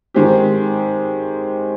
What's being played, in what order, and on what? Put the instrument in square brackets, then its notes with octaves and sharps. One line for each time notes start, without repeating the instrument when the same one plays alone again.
[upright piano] D#3 G#3 C4 G4